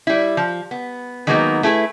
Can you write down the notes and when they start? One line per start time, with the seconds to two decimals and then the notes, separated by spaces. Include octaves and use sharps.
0.07 G3 E4
0.37 F3
0.71 B3
1.27 D#3 F#3 G#3 A#3 B3 D#4
1.63 A3 E4 G#4 B4